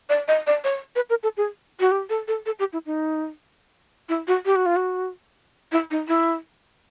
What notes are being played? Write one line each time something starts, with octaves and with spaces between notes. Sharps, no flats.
D5
D#5
D5
C#5
B4
A#4
A4
G#4
F#4
G4
A4
A4
A4
G4
E4
D#4
E4
F#4
G4
F#4
F4
F#4
E4
D#4
E4